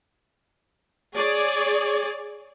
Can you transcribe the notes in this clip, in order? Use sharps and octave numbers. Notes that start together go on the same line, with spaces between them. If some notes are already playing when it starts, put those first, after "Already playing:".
G#4 C#5 D5